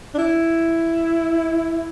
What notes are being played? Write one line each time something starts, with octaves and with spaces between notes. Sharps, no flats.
D4
E4